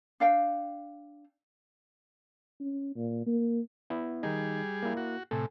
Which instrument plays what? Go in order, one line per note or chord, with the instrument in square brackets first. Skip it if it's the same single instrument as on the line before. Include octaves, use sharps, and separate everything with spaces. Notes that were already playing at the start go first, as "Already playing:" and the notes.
[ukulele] D4 F5 G5
[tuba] C#4
A#2
A#3
[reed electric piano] B3 E4
[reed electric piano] D#3 D#4 [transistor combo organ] G3 G#4
[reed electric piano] A#3 E4
[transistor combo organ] F#4
[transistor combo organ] A2 C3 [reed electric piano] A4 G#5